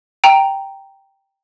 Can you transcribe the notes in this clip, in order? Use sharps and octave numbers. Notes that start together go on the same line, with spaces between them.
G5 A#5